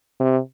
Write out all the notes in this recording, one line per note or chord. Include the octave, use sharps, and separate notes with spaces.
C3